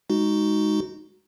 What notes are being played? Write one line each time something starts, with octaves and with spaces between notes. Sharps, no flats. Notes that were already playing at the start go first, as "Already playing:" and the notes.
G#3 D#4 F#4